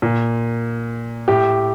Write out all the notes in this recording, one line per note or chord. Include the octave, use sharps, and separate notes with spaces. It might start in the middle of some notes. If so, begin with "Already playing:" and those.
A#2
A2 G4